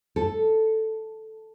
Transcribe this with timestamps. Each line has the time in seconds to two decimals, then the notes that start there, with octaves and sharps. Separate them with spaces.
0.16 A4